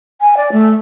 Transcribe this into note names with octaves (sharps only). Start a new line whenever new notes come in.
G#5
D5
A3